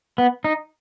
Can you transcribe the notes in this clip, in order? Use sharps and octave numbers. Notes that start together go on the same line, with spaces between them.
B3
D#4